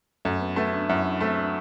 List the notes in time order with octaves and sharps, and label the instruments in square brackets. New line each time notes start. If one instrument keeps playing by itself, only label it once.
[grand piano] F#2 [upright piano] A3
[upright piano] B3
[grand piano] A3 [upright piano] B3
[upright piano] D4
[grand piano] F#2 [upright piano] E4
[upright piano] E4
[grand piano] A3 [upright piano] C4
[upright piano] D4